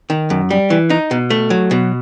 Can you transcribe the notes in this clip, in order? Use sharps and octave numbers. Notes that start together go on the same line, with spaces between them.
D#3
F#2
G3
E3
D#4
B2
A3
F#3
B2